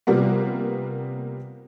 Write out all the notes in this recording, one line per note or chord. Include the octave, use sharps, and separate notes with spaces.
C3 F3 G3 A#3 B3